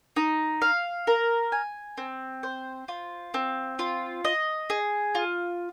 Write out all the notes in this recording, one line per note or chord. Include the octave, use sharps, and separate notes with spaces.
D#4
F5
A#4
G#5
C4
C5
F4
C4
F4
D#5
G#4
F4